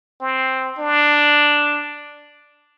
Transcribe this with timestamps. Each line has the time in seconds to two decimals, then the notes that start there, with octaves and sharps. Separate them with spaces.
0.21 C4
0.78 D4